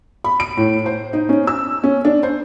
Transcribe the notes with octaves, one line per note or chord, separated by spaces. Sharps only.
B5
D7
A2
C5
D#4
C#4
E6
C#4
D4
C5